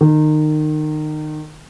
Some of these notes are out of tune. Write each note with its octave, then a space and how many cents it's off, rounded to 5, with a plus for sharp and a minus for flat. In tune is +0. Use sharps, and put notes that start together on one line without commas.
D#3 -25